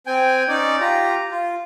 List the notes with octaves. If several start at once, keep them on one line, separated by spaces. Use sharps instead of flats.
C4 G5 G#5
C#4 D#4 D5
F4 G4 A#5
F4